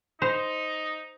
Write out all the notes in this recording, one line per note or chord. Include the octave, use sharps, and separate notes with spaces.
D#4 C5